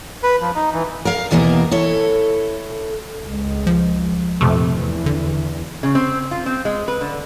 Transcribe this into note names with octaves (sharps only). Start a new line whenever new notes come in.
B4
F3
D#4
E3
A#4 F5
D#2 B2 E3 A#3 B3 A#4
E4 A4 C#5
C#2 G#3
F3
A#1 F2 A2 C3 A3
E2 E3
D3
C#3
C4
F4
C4
G#3
B4
D3